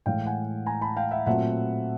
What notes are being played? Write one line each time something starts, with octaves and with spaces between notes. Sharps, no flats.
A2 E3 G#3 F5 G5
F#5 G#5
G#5 A#5
A5 B5
F5 G5
E5 F#5
A#2 F#3 A3 C4 E5 F#5